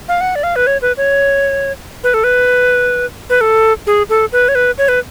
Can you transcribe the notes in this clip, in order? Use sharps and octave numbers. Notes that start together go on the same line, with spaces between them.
F5
F#5
D5
F5
B4
C#5
B4
C#5
B4
A4
B4
B4
A4
G#4
A4
B4
C#5
B4
C#5
B4